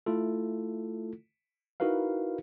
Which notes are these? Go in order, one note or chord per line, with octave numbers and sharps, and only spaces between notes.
A3 E4 F4 A4
D#4 E4 F#4 A#4 B4 F5